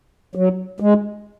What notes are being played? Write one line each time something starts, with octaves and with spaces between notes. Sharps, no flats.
F#3
G#3